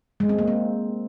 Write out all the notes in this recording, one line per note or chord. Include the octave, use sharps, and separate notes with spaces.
G#3
C4
A#3
C4